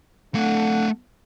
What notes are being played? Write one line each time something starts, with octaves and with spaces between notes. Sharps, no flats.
A3 D4 A4 F5 F#5